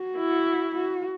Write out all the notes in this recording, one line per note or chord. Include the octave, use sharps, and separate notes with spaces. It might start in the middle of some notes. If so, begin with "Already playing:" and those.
Already playing: F#4
E4
F#4